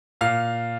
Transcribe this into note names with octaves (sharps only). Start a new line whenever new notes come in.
A#2 F5